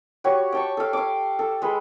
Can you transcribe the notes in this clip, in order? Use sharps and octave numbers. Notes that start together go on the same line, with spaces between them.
F#4 G4 C#5
G5 A5 C#6
A4 F5
F5 D6
A4
G#3 B4